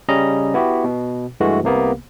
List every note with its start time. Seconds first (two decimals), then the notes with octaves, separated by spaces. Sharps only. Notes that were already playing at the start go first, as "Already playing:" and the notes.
0.09 C#3 G3 C#4 D#5 A#5
0.54 B3 E4 F#4 G4
0.84 B2
1.40 G2 E3 G#3 A3 F#4
1.63 C2 C3 A#3 B3